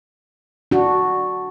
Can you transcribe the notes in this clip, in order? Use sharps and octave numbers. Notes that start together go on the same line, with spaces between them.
D4 F#4